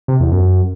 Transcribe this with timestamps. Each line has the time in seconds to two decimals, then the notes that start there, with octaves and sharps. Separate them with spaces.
0.08 C3
0.20 E2
0.32 F#2